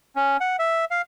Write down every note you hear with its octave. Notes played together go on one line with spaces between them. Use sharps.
C#4
F#5
E5
F5